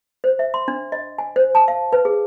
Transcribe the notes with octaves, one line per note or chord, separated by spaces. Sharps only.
C5
E5
C6
D4
D#5
G#5
C5
A5
F5
B4
G#4